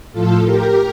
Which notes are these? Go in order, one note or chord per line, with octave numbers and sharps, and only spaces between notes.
A2 F3 F4 A4
G4 A#4